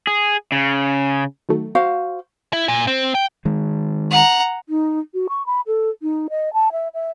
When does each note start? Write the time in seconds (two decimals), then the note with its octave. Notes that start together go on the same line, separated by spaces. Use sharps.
0.07 G#4
0.52 C#3
1.49 D#3 F#3 A3
1.75 F#4 C5 F5
2.53 E4
2.68 A#2
2.87 C4
3.15 G5
3.45 D#3 G#3
4.11 F#5 A#5
4.69 D#4
5.14 F#4
5.29 C#6
5.46 B5
5.67 A4
6.02 D#4
6.30 D#5
6.53 A5
6.72 E5
6.94 E5